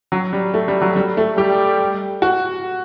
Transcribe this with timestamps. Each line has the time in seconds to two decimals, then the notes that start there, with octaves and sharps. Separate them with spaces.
0.12 F#3
0.33 G3
0.54 A3
0.68 G3
0.81 F#3
0.96 G3
1.17 A3
1.37 G3 G4
2.22 F#4